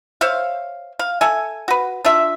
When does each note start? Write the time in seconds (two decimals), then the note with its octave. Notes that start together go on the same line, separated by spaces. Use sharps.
0.21 C5 C#5 E5 F5
0.99 F5
1.21 A4 E5 G#5
1.68 F#4 B4
2.05 D4 F4 E5